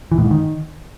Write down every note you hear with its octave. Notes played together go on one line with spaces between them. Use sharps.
E3
A2
G#2
D#3